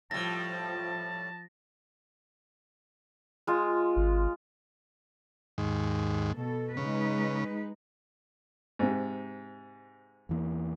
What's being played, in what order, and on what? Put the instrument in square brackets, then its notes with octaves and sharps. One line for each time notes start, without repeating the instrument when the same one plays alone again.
[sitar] A2 G3 [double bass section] F3 [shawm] A5 [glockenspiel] A#6
[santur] G#3 F4
[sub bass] G#1
[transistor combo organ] D#2 G#2
[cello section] B2 A4
[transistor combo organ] C#3 [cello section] G#3 D#4 B4
[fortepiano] G#2 C3
[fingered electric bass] E2 E3 A#3